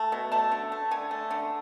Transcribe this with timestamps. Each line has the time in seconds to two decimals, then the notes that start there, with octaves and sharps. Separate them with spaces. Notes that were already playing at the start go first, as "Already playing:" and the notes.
Already playing: A3 A5
0.12 B2
0.32 A3 A5
0.52 D3
0.72 A3
0.91 D3 G#5
1.11 A3
1.30 D3